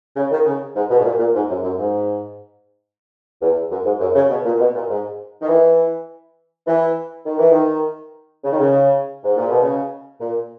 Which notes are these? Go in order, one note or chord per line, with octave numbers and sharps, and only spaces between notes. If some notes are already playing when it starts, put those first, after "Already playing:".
C#3
D#3
C#3
G#2
B2
G#2
A#2
A#2
G#2
F#2
F#2
G#2
E2
F#2
G#2
F#2
C#3
B2
A#2
B2
A#2
G#2
D#3
E3
E3
D#3
E3
D#3
C#3
D#3
C#3
G#2
A#2
B2
C#3
A#2